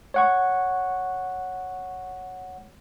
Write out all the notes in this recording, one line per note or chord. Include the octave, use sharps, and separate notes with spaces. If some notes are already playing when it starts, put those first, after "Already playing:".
C#5 F#5 C#6